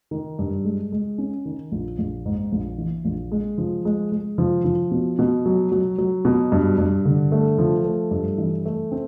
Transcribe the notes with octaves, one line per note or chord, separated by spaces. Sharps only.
D#3
G2
G#3
G#3
C#4
D#3
A#1
A#1
G#2
A#1
E3
A#1
G#3
F3
G#3
G#3
F3
F3
B2
B2
F#3
F#3
F#3
B2
G2
G2
D3
A3
F3
A3
G2
E3
A3
C4